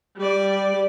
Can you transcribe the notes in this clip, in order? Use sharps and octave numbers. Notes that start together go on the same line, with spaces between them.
G3 D5